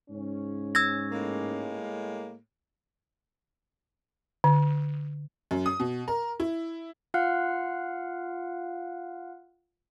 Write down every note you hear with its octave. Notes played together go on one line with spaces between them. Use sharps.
G#2 C#3 C#4
E6 G#6 A#6
A2 G#3 A#3
D3
F#2
D#6
B2
A#4
E4
F4 F5 F#5 F6 F#6